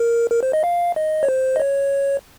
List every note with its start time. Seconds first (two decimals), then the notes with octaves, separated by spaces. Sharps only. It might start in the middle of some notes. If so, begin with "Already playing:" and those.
Already playing: A#4
0.31 A#4
0.43 C5
0.53 D#5
0.64 F5
0.96 D#5
1.23 C#5
1.28 C5
1.56 D#5
1.60 C#5